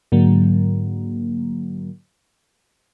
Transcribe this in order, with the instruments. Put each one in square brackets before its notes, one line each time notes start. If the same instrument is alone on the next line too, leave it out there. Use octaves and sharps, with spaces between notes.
[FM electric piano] G#2 D3 F#3 A#3